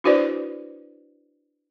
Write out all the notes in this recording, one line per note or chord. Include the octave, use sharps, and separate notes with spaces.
D4 E4 F#4 B4 C5 D5